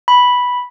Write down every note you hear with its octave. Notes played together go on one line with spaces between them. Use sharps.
B5